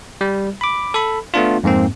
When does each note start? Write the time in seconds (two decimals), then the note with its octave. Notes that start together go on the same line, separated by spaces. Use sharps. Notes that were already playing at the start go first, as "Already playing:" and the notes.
0.21 G3
0.61 B5 D6
0.94 A4 B5
1.34 A3 B3 D4 F4
1.63 F2 G#2 A#3 C4